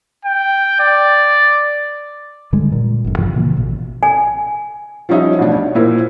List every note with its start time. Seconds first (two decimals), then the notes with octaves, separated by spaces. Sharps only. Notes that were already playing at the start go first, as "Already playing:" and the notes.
0.25 G5
0.80 D5
2.53 G2 D3 G3 G#3
2.72 A#2
3.04 G1 F#2
3.18 G2 C3 E3 F3
3.33 A#2 C#3 E3 A#3
3.57 A1 B2
4.03 G#5
5.09 F3 G3 C#4 D#4 C#5 E5
5.39 A1 B2 D4
5.54 C#5
5.75 A#2 E4 A#4 C5